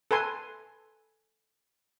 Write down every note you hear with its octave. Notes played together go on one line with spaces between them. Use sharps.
A4 B4 G#5 C6